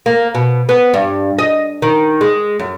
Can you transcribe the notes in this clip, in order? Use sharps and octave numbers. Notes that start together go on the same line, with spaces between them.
A#3
B2
B3
G2
D#5
D#3
G#3
F#2